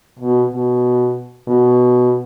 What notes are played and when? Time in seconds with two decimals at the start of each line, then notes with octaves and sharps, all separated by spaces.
0.19 B2
0.51 B2
1.48 B2